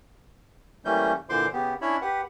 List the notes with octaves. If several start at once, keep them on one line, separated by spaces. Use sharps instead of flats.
E3 G3 A3 A#3 C#4 G6
A#2 D3 E3 C5 C6 D6
C#3 B3 G4
C#4 D4 E4 C#5 E5 B5
G4 B4 F#5